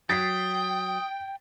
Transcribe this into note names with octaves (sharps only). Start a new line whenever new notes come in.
F#3 G5 D#6 A6 B6 C7